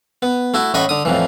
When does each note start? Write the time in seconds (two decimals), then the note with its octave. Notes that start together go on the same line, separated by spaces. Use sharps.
0.22 B3
0.54 A3 E4 F#4
0.74 A1 A2 D#5 F#5 B5 C#6
0.89 D3 D#6
1.05 F2 A2 E3